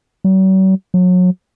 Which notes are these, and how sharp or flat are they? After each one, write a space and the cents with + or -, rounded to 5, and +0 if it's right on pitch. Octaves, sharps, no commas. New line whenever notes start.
F#3 +45
F#3 -30